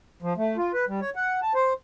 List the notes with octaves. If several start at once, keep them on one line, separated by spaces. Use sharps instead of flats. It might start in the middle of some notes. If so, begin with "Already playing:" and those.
F3
A3
F4
B4
G3
C#5
F#5
A5
C5